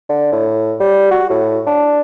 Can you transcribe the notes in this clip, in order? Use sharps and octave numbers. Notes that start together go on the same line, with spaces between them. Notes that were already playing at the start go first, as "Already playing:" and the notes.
D3
A2
G3
F#4
A2
D4